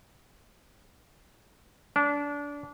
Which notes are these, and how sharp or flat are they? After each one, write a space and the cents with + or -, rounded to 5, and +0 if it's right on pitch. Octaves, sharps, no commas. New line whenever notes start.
D4 -25